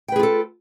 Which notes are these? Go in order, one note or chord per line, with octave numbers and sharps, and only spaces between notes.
F4 G#4 A4 B4 G5